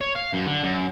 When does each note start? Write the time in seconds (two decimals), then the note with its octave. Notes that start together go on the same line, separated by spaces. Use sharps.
0.01 C#5
0.16 F5
0.34 F#2
0.47 D3
0.64 F#2